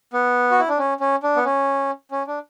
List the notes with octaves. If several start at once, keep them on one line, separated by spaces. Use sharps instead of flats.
B3
F#4
E4
D4
C#4
C#4
D4
B3
C#4
C#4
D4